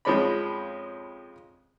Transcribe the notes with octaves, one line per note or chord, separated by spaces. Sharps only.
F2 F3 G#3 C#4 D5 B5